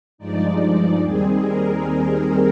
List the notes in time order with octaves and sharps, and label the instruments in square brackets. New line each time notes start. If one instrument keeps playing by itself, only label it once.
[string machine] G2 F3 G#3 D#4 D5
D#2 D#3 G3 C4 G#4
A#4